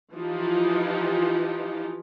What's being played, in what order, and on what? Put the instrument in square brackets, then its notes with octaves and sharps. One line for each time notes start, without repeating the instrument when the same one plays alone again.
[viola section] E3 F3 D#4 G4